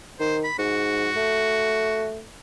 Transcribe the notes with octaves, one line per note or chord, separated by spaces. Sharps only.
D#3 C5
B5
G#2 F#4
A3